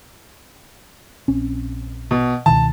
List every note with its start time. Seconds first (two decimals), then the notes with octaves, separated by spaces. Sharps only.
1.28 A#1 C4 C#4
2.11 B2
2.46 C#2 B2 D#3 A5